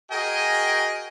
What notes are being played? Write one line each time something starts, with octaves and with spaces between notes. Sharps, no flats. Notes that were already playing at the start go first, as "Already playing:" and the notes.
F#4 G#4 A#4 D#5 G5 G#5